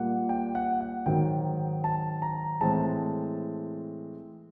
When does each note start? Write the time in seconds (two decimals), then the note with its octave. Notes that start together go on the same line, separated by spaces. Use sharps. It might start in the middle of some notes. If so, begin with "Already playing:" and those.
Already playing: A#2 G3 A#3 F#5
0.29 G5
0.55 F#5
0.80 F#5
1.06 G#2 D#3 F#3 G5
1.84 A5
2.22 A#5
2.61 A2 E3 G#3 C4 A5